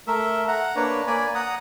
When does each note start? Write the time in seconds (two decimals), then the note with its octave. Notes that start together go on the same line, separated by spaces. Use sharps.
0.07 A3 A#4 E5
0.48 F#5 A#5
0.76 A#3 D4 B4 C#5
1.07 A#3 D5 G#5 B5
1.35 F#5 A#5 D#6